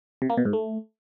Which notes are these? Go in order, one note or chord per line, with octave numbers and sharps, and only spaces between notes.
C3
A#3
B2
G#2
A3